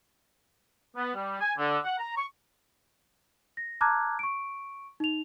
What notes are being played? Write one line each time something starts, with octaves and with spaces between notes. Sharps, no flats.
B3
G3
G#5
D3
F#5
A#5
C#6
A#6
A5 A#5 D6 F6 F#6 G#6
C#6 D7
D#4 F7